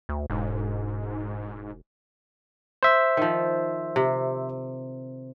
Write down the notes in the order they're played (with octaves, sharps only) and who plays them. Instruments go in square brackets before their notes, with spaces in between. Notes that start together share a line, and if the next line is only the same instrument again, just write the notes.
[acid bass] D2
[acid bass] E1 [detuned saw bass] G#2
[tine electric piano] C5 E5
[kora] D#3 F3
C3